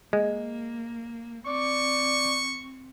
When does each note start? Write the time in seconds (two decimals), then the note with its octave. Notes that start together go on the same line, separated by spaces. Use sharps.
0.13 G#3 A#3
1.47 C4 D5 C#6